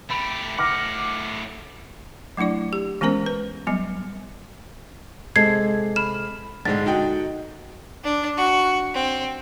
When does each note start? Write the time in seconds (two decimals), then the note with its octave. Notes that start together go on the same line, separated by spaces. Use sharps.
0.10 A3 G4 B5 D7
0.59 A2 F#5 D6 F6 A#6
2.37 F#3 A3 D4 E4 D5
2.73 G4
3.01 E3 G#3 B3 C#4 A#4 C5
3.26 B4
3.67 F#3 G3 B3
5.36 C3 G#3 A4 G#6 C7
5.96 B5 F6 E7
6.65 A#1 G#2 D3 G#3 A6
6.86 D#4 F#4 G5
8.04 D4
8.37 F#4
8.94 C4